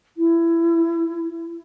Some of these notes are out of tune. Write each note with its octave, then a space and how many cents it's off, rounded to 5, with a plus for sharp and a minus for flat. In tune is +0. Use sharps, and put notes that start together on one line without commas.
E4 +20